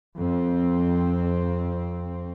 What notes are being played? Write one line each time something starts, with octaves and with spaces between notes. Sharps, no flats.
F2 C4